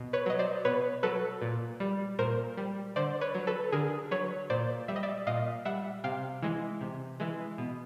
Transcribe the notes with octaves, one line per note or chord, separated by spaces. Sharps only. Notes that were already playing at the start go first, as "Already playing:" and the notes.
Already playing: B2
B4 C#5
F#3 D#5
C5 D5
B2 B4 C#5
F#3 A4 B4
A#2
G3
A#2 A#4 C5
G3
D3 C5 D5
B4 C#5
F#3
A4 B4
D3 G#4 A#4
F#3 B4 C#5
A#2 C5 D5
G3 E5
D#5
D5 E5
A#2 D#5 F5
G3 E5 F#5
C3 F5 G5
E3 G#3
C3
E3 G#3
B2